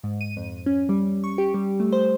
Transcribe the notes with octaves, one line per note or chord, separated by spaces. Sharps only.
G#2
D#7
F2
C#4
G3
C#6
G4
G3
A3
C5